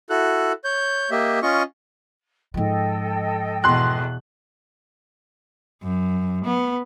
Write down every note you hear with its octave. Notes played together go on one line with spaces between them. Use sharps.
E4 F#4 A4 F#6
C#5 G6
A#3 G4 D#5 E5
C#4 F4 D#5 C#6
G#2 F3 A4 D#5 G5
E2 B2 C6 F#6
F#2
B3